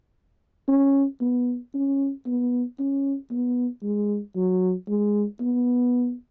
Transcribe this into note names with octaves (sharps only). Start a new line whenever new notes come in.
C#4
B3
C#4
B3
C#4
B3
G#3
F#3
G#3
B3